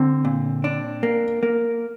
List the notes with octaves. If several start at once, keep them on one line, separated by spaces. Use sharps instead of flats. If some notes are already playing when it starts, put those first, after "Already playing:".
Already playing: D3 C4
A#2
D4
A#3
A#3